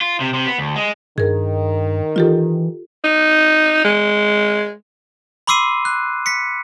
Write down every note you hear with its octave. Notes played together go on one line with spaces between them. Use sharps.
F4
C3
C3
B3
D2
G#3
G2 D#3 G#4 A#4
E3 F4 G4 A4
D#4
G#3
B5 C6 D6 E6 C7 D#7
F#6
B6 C#7